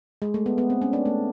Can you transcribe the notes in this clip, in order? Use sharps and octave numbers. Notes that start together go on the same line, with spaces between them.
G#3
A3
B3
B3
C4
C#4
D4
A3